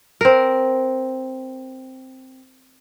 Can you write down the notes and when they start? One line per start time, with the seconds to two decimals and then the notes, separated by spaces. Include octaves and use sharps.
0.21 C4 A#4